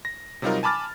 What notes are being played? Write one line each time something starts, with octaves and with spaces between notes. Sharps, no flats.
A#6
C3 F#3 G3 D#4 F4 A#4
G#5 A5 B5 D6 F6 A6